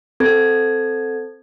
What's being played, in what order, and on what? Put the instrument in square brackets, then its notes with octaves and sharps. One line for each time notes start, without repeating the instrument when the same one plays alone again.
[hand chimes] C4 A4 G#6